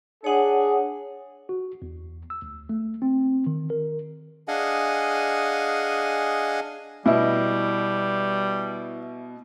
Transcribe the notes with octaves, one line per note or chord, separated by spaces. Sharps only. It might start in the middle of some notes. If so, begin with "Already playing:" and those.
D4 G#4 C#5 F#5
F#4
E2
E6
D2
A3
C4
D#3
A#4
D4 G#4 D#5 F5 F#5 G#5
B2 G3 E4 D#5